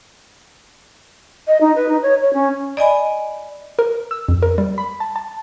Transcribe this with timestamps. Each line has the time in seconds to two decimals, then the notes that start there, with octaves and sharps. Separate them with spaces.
1.47 D#5
1.61 D#4
1.76 B4
1.89 D#4
2.02 C#5
2.22 C#5
2.34 C#4
2.77 D5 D#5 G#5 B5
3.79 A#4
4.11 E6
4.28 F2
4.43 A#4
4.58 G3
4.78 B5
5.00 A5
5.16 A5